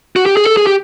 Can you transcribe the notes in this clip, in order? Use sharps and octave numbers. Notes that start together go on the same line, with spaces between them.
F#4
G4
G#4
A4
G#4
G4